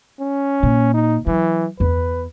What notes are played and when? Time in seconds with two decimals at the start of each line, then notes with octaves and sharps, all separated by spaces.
0.20 C#4
0.63 A#2
0.94 D#4
1.27 E3 F#3
1.80 E2 B4